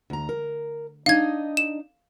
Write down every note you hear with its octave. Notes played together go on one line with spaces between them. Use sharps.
D2 A#5
A#4
D4 D#4 D#5 F5 G#6
E7